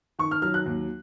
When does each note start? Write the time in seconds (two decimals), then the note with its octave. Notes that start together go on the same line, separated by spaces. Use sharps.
0.19 D#3 C#6
0.31 F6
0.42 F#3 F6
0.54 F#6
0.66 D#2